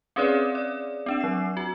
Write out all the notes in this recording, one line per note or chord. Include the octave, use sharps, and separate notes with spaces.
C4 C#4 G#4 B4 C#5 D5
D5
C4 D4 E7
F#3 C7
F#4